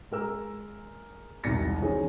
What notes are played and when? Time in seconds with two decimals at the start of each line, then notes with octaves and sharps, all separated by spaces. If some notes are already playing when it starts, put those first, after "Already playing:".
0.12 G#3 A#4 E6
1.44 E1 C2 D#3 A6 A#6 C#7
1.80 D#3 E3 C4 C#4 G#4